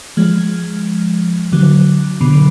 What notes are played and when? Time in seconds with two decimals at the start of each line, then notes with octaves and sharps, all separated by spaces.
0.17 F3 G#3
1.52 D3 F#3
2.21 B2 D3